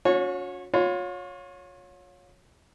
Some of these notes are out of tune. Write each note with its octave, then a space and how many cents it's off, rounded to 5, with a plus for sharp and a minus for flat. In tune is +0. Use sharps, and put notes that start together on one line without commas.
C#4 +35 F#4 -40 C#5 -15
F4 +40 C#5 +0 C6 -35